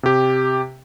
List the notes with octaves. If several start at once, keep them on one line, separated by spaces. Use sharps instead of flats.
C3 G4